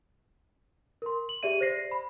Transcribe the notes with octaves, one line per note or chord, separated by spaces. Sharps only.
A#4 C6
F#7
G4 G#4 D5 E5 D#7
C5 D5 A#6 C7
B5